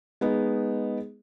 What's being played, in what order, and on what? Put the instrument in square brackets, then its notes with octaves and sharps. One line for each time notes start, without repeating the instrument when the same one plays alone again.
[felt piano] G#3 B3 D#4